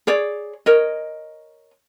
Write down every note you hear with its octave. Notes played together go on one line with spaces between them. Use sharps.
G#4 C#5 D5
A#4 C#5 D#5